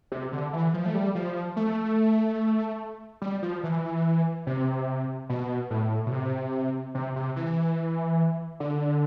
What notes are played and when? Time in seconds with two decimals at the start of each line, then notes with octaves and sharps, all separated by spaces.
0.12 C3
0.32 D3
0.53 E3
0.74 F3
0.86 A3
0.94 G3
1.15 F3
1.56 A3
3.22 G3
3.42 F3
3.63 E3
4.47 C3
5.29 B2
5.70 A2
6.06 B2
6.12 C3
6.95 C3
7.16 C3
7.36 E3
8.60 D3